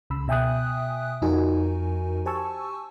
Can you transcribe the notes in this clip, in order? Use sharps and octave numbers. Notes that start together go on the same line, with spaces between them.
C#2 C#3 B5 E6
B2 E5 G5 G#5 D#6 F#6
F2 F3 D#4 F#4 A#4 G#5
G4 C5 G#5 A5 C#6 E6